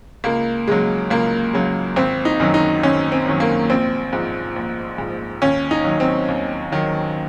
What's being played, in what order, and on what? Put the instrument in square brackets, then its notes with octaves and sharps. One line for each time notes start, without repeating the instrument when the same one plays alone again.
[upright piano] C#2 A#3
C#3 F#3 G#3
C#2 A#3
C#3 F#3
G#1 C4
D#4
F#2 D#3 F#3
D#4
G#1 C#4
C4
F#2 D#3 F#3
A#3
A#1 C4
G#2 F3
A#1
G#2 F3
D#2 C#4
D#4
D#3 F#3
C4
D#2
D#3 F#3